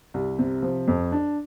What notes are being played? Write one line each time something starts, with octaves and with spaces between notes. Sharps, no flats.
C2
C3
F3
F2
D4